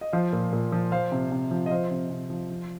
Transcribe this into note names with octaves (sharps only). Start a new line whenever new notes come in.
D#5
F3 C5 F5
A#2
A#2
F3
F3 C5 F5
C3
C3
F3
D#5
F3 C5 F5
C3
C3
F3
F3